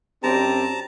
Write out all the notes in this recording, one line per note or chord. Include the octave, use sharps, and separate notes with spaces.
F#2 C4 D4 G4 A5 A#5